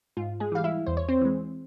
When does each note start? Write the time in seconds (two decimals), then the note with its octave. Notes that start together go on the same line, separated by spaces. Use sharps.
0.17 G#2 F4
0.40 G#3 G#4
0.52 E3 G3 F5
0.64 E4 E5
0.87 E2 C5
0.97 C#5
1.08 C4 C5
1.21 E3 G#3